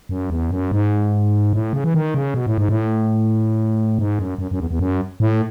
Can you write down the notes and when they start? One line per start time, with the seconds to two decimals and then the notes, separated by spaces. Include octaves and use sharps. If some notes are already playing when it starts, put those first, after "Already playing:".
0.09 F#2
0.30 E2
0.51 F#2
0.72 G#2
1.53 A2
1.73 C#3
1.84 E3
1.94 D#3
2.14 C#3
2.34 B2
2.47 A2
2.58 G#2
2.69 A2
3.99 G#2
4.19 F#2
4.38 F#2
4.51 F#2
4.60 E2
4.71 E2
4.79 F#2
5.20 A2